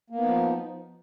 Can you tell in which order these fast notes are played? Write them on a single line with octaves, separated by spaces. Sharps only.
A#3 B3 D#4 F3